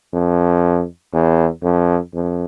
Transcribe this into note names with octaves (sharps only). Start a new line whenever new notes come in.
F2
E2
F2
F2